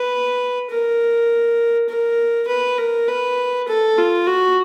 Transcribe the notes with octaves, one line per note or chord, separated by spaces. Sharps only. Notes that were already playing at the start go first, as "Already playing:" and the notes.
Already playing: B4
A#4
A#4
B4
A#4
B4
A4
F4
F#4